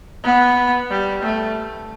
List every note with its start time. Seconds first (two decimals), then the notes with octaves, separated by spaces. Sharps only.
0.24 B3
0.90 G3
1.23 A3